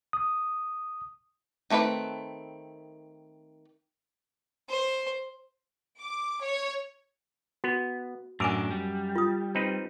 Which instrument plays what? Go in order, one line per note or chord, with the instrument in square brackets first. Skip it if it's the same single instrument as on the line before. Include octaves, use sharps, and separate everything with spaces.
[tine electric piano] D#6
[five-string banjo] D#3 A3 C4 B4 B5
[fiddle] C5
[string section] D6
C#5
[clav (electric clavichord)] B3 [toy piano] F#4
[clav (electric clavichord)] F#2 A#4 [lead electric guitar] A2 D4 [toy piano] G#5 D6 E6
[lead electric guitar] G3
[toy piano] F4 D#6
[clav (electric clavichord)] C4 D#4 B4